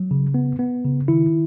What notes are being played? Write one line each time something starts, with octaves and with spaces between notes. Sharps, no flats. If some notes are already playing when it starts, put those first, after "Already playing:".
Already playing: F#3
C#3
B3
B3
C#3
D#3 E4